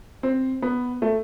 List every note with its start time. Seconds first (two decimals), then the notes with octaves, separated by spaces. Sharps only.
0.23 C4
0.62 B3
1.02 A3